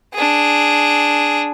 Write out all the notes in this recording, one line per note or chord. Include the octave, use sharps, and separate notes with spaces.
D4 G#4